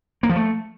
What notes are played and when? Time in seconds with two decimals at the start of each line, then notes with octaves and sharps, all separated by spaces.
0.23 A#3
0.30 F3
0.36 A3